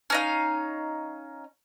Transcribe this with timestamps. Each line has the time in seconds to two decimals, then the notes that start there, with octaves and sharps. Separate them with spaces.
0.10 C#4 D#4 F5